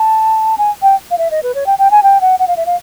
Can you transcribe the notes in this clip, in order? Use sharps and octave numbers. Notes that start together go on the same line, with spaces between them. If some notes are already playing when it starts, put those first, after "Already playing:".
Already playing: A5
G#5
G5
F5
E5
D#5
B4
C#5
G5
G5
G#5
G5
F#5
F#5
F5
E5
F5